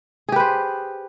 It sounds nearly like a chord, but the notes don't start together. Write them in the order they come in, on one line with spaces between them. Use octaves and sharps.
G#4 G4 B4 C5